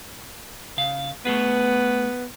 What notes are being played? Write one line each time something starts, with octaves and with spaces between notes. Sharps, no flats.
C#3 F5
A3 B3 G#4 B4